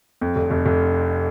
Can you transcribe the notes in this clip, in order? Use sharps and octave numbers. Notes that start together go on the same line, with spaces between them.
F2
F1
F1
F1